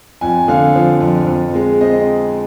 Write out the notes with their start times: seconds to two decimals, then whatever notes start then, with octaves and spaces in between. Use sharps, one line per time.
0.21 F2 G#5
0.48 D3 F5
0.75 F3
1.01 F2
1.27 F2
1.54 G#3
1.81 C4 D#5